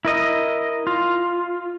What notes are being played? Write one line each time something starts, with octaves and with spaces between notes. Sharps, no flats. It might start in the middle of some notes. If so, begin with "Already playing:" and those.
E4 A#4 D#5
F4